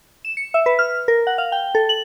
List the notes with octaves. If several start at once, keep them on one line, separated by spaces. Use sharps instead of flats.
E7
C#7
E5
B4
F6
A#4
F#5
F5
G5
A4
F#7